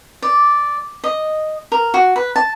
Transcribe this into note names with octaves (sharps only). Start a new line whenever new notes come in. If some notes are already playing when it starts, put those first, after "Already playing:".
D5
D#5
A#4
F#4
B4
A5